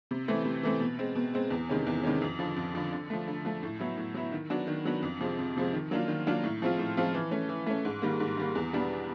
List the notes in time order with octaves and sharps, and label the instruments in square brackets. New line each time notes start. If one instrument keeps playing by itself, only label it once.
[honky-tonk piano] C3
E3 A3 C4
C3
E3 A3 C4
B2
G#3 C4
B2
G#3 C4
E2
C3 D#3 G#3 C#4
E2
C3 D#3 G#3 C#4
F2
D3 F3
F2
D3 F3
D3
F3 A3
D3
F3 A3
A2
F#3 B3 E4
A2
F#3 B3 E4
D#3
F#3 B3 D4 F#4
D#3
F#3 B3 D4 F#4
F2
C3 F3 G#3 C4
F2
C3 F3 G#3 C4
D#3
F#3 A#3 D4 F4
D#3
F#3 A#3 D4 F4
A2
F3 G#3 C4 F4
A2
F3 G#3 C4 F4
E3
A3 C#4
E3
A3 C#4
G#2
D#3 G3 A#3
G#2
D#3 G3 A#3
E2
B2 G3 B3 D4